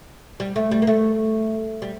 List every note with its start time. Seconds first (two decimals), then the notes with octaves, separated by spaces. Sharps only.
0.40 G3
0.56 A3
0.71 G3
0.82 A#3
0.87 A3
1.82 G3